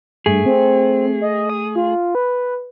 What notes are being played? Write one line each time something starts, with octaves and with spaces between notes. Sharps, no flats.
G2 A3 G#4
C4
D#5
D#6
F4
B4